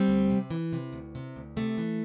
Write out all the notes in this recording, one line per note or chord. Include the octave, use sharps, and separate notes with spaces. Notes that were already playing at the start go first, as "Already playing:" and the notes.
Already playing: G3 C4
D2
C3
E3
C3
D2
C3
D2
C3 A3
E3